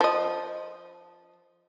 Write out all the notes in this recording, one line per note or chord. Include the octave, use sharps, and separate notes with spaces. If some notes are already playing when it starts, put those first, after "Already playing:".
F3 D#5